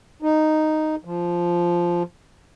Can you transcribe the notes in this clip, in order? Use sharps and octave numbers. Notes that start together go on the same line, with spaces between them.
D#4
F3